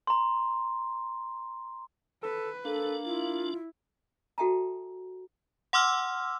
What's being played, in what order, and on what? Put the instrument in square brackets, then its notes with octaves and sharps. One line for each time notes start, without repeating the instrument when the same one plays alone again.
[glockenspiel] A#5 C6
[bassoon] A4 [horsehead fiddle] B4
[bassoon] A#3 [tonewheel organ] D4 [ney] A4
[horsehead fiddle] E4 [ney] F4
[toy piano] F#4 A4 E5 G5 A5 A#5
[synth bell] F#5 C6 D6 E6 F6